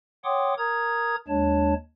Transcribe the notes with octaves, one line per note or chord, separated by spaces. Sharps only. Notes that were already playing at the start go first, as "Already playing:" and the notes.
C#5 F#5 G5 C6 D6 D#6
A#4 A#5 D#6 G#6
D#2 G#3 D4 C#5 A5